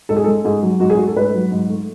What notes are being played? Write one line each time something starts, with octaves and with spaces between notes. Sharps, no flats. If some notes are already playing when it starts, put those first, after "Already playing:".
G#2 A4
G#4
G#3 A4
G#2 G#4
F#3
G#2 F#4
G#4
A3 F#4
A4
G#2 B4
F#3
G#2
A3